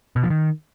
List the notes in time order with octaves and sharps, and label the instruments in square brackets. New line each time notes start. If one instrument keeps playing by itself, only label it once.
[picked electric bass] B2
F3
D#3